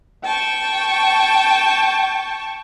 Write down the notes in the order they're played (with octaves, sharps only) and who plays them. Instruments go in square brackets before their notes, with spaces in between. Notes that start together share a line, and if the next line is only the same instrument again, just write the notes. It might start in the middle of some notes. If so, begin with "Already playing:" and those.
[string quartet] G5 A5 C#6